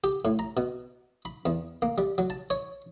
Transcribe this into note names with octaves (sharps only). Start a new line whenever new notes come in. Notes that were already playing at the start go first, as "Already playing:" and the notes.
G4
A2
A#5
B2
B5
E2
A#3
G3
F#3
A5
C#5